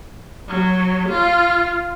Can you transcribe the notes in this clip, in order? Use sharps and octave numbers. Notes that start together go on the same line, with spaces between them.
F#3
F4